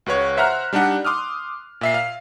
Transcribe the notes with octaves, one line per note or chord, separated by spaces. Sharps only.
C#2 F#4 B4 C#5
C5 E5 F#5 A#5 F6 F#6
G3 D4 D#4 G4 F#5
C6 D6 D#6 F6
A#2 E5 C7
F5